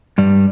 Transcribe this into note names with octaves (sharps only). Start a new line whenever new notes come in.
G2 G3